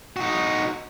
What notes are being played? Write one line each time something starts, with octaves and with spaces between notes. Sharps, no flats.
D#4 F#4